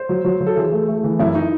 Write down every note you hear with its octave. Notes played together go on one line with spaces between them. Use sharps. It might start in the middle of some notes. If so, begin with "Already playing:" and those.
Already playing: C5
F#3
F#3
F#3
A4
E3 G#4
A3
A3
E3
F#2 E4
D#4